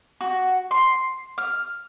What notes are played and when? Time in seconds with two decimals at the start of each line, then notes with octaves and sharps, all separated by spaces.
0.21 F#4
0.71 C6
1.38 F6